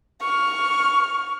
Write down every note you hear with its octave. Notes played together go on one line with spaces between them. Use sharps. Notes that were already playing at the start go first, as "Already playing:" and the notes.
C#6 F6